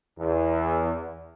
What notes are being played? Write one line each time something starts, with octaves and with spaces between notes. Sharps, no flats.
E2